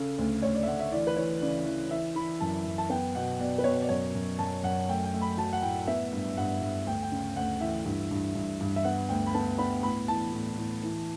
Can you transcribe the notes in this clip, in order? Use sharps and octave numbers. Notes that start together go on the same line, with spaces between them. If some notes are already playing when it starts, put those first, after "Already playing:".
Already playing: C#3 A4
D2
D2 C#5
D5
E5
D2 F#5
E5
E3 D5
B4
E3 C#5
C#3 D5
E3
E3 E5
E3 B5
F#2 A5
F#2
A5
B3 G5
B2 F#5
B2 D5
B4
B2 C#5
D5
F#2 C#5
F#2
F#2 A5
F#2 F#5
A3 G5
G5
A3
B5
F#3 A5
F#5
A2 G5
B3 E5
G2
G2 F#5
G2
D2 G5
G5
C#3
D2 F#5
E3 E5
G2
G2
G2
G2
E5
B3 F#5
D2 G5
B5
B3 A5
B3 B5
A2 B5
E3 A5
A2
A2
E3